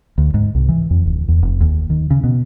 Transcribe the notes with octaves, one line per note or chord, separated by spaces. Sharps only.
D2
G#2
C2
E3
F2
D1
E2
F1
D#2
D#3
C#3
B2